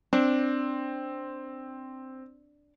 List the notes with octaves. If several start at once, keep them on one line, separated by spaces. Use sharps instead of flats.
C4 D4